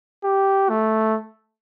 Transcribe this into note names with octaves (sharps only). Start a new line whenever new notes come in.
G4
A3